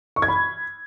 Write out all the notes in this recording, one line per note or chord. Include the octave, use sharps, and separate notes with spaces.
C#6
G#6
B5